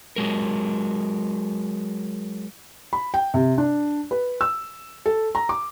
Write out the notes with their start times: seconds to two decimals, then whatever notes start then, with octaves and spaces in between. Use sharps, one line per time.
0.16 F#3 G#3 A#4
2.93 B5
3.14 G5
3.34 C3
3.58 D4
4.11 B4
4.41 E6
5.06 A4
5.35 A#5
5.49 D6